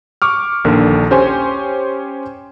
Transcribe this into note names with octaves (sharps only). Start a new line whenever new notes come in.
C#6 D6 F6
A#1 D#2 D3 A#4
C#4 G4 C5 C#5 G#5